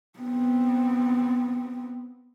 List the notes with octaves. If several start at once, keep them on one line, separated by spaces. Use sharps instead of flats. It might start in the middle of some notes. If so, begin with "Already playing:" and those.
B3 C4